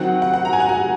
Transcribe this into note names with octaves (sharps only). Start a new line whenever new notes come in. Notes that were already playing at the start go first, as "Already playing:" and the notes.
Already playing: D#3 F#3 C4 F#5
F#5
F#5
A#5
G#5
F#5
G#5